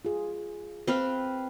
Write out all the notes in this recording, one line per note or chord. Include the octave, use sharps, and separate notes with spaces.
F4 G#4
C4 B4 F5